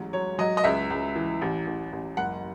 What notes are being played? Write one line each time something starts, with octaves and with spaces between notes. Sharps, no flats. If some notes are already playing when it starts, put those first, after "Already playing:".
Already playing: A1 G#2 F#3
F#3 C#5
F#3 D#5
D#5
C#2 E5
C#2
E3
A1
A1
A1
F#1 F#5